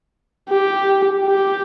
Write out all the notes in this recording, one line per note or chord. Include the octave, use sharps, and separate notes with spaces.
G4
G4